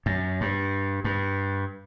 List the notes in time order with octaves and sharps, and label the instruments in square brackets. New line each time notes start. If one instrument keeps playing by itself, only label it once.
[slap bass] F#2
G2
G2